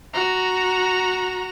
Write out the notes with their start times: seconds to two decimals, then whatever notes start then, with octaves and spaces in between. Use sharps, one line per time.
0.13 F#4 A#5